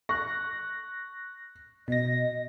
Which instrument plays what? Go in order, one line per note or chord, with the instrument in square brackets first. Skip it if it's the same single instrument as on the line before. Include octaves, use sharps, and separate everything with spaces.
[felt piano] C#6 [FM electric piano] F#6 A#6
[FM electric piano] B2 A#6 [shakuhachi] D#5